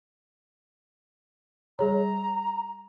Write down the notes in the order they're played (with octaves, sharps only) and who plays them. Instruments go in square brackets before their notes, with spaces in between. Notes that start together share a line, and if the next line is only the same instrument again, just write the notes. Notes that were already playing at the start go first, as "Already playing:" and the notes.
[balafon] G3 G#4 C#5 [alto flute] A#5